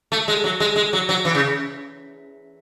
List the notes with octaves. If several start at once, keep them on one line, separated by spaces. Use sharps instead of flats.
A3
G#3
F#3
G#3
G#3
F#3
F#3
E3
C#3